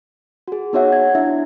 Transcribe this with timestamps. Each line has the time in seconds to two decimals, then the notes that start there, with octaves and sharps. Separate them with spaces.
0.48 F#4 G#4
0.73 B3 D#4 F#4 C#5 E5 F#5
0.93 G#6
1.15 D4 E4 F#4 E5